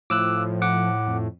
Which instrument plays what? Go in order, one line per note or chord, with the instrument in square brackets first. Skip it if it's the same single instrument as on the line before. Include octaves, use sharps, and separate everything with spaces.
[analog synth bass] A2 [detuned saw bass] F3 [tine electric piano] D6 E6 F#6
[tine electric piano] F#5 D6
[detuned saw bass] F2